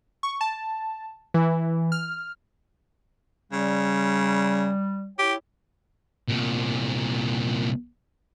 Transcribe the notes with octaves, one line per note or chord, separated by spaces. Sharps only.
C#6
A5
E3
F6
C#3 G3
E4 G4 C#5 G5
C2 A#2